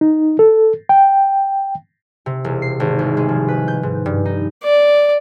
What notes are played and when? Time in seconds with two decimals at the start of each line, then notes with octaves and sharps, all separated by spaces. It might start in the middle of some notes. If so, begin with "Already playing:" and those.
0.01 D#4
0.39 A4
0.89 G5
2.26 C3
2.44 E1
2.62 C7
2.80 G#1
2.99 C2
3.17 G#3
3.29 F3
3.48 B4
3.68 G6
3.83 G#2
4.06 G2
4.25 D#4
4.63 D5